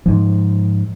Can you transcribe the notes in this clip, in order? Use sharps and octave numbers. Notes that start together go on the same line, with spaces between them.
G#2 F3